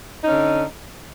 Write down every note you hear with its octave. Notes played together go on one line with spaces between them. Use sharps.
D3 C#4 D#4